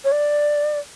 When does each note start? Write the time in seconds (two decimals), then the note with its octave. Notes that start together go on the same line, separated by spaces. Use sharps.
0.04 C#5
0.12 D5